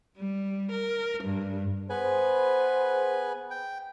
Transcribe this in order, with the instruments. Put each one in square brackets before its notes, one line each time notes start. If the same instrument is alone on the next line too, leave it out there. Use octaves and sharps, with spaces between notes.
[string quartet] G3
A#4
G2
[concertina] B3 B4 G#5 [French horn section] G#4 C5
[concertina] G5